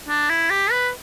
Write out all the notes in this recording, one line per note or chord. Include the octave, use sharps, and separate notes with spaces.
D4
E4
G4
B4